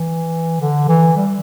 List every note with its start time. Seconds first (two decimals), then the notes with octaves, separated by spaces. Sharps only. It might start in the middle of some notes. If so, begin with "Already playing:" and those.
Already playing: E3
0.61 D3
0.89 E3
1.17 G3